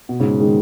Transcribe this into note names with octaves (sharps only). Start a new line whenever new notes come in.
B2
G#2 C#3
D#3 G#3